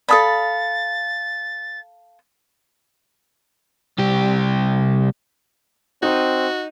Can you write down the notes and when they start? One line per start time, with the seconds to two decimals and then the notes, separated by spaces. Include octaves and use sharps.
0.09 A4 D5 F5 A5 B5 D#6 A6
3.98 C2 G4
6.03 C4 D#4 F#4 D#5